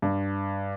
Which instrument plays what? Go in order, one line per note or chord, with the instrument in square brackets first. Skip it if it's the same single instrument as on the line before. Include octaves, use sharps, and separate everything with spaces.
[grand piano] G2